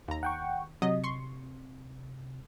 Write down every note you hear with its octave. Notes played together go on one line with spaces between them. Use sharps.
D#2 A#5
F#5 G5 C#6
C3 F#3 D#5
C6 C#6